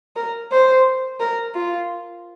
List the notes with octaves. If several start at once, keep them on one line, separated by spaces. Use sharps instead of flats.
A#4
C5
A#4
F4